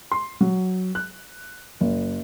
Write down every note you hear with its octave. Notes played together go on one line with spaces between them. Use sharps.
C6
F#3
F#6
F#1